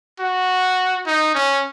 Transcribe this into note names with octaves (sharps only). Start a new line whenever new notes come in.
F#4
D#4
C#4